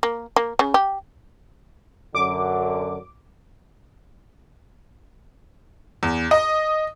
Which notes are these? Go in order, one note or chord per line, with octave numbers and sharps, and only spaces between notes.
A#3
A#3
C#3
G4
F#2 D3 D6
E2
D#5